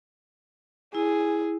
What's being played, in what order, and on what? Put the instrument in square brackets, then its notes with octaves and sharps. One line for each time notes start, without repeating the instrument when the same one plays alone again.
[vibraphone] E4 [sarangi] G#4